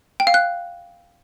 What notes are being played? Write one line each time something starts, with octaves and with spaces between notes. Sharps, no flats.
G5
F5
F#6